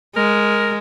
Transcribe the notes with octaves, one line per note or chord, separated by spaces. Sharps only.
G#3 A#4